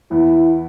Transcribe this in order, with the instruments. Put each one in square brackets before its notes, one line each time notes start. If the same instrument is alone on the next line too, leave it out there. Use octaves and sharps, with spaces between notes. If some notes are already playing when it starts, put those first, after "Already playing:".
[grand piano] E2 E3 B3 [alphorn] E4